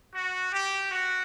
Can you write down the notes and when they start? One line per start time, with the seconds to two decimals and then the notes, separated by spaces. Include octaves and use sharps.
0.14 F#4
0.53 G4
0.91 F#4